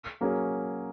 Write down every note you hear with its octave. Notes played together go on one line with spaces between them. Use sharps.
F#3 A#3 C#4 G#4